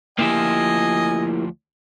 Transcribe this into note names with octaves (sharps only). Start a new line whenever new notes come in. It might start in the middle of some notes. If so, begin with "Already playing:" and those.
D2 F3 A#3 E4 G4 D#5 G#5